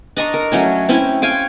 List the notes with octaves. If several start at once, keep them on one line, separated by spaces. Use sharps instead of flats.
D4 D#5 A#5 C#6
A#4
F#3 A3 C#4 C#5
C4 C#4 E4
F5 G5 G#5 C#6